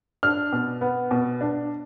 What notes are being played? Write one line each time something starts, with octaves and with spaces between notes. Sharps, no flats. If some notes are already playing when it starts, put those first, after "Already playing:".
D4 F6
B2
B3
B2
D4